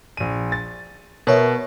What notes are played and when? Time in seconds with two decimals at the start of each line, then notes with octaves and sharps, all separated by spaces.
0.17 A#1 D#7
0.52 A6
1.27 B2 A#4 C#5 E5